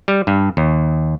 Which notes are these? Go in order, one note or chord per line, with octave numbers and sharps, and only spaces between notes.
G3
G2
D#2